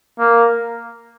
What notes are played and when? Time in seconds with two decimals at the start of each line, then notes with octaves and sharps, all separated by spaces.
0.19 A#3